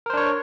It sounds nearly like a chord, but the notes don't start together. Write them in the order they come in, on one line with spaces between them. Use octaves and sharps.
A#4 C5 D4 C#5